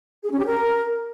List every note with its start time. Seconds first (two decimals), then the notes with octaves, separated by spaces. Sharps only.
0.24 G#4
0.31 C#4
0.38 G4
0.45 A#4